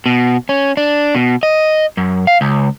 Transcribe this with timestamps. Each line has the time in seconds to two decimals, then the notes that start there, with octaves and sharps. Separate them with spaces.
0.06 B2
0.49 C#4
0.77 D4
1.15 B2
1.43 D#5
1.97 F#2
2.27 F5
2.41 C#2